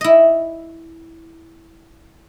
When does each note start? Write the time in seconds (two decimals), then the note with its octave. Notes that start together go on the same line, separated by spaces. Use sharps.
0.01 E4 D#5